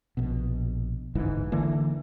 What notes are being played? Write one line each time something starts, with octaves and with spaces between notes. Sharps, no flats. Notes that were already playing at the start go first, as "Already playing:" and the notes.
A#1 B2
A1 D2 G#2 E3
D3 E3 A#3